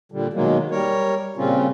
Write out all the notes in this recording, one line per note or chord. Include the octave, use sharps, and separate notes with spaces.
A#2 D3 G3
B2 D#3 F#3 G#3 A#3
G3 A#4 C#5
A#2 C#3 G3 C4 C#4 F4